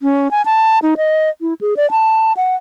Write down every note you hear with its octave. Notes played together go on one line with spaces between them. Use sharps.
C#4
G#5
A5
D#4
D#5
E4
G#4
D5
A5
F#5